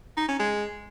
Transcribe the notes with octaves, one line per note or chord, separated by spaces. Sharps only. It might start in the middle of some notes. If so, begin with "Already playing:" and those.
D#4
C#4
G#3